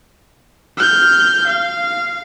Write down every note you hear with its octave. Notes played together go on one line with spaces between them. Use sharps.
F6 G6
F5